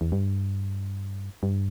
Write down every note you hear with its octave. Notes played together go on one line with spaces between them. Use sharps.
E2
G2
G2